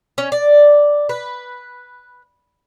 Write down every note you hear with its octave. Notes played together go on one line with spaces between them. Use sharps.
C#4
D5
B4